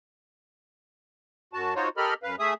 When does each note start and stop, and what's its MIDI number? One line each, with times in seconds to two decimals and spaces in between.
1.53 1.74 42
1.53 1.74 66
1.53 1.74 81
1.76 1.89 63
1.76 1.89 65
1.76 1.89 66
1.76 1.89 72
1.76 1.89 73
1.97 2.14 67
1.97 2.14 69
1.97 2.14 70
1.97 2.14 75
1.97 2.14 83
1.97 2.14 89
2.23 2.36 42
2.23 2.36 71
2.23 2.36 77
2.39 2.54 57
2.39 2.54 68
2.39 2.54 76
2.39 2.54 87